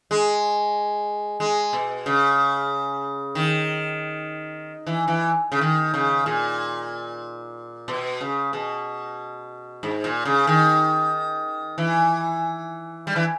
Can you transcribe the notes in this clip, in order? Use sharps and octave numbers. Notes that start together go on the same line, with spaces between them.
G#3
G#3
B2
C#3
D#3
E3
E3
C#3
D#3
C#3
A#2
B2
C#3
B2
G#2
A#2
C#3
D#3
E3
G3
E3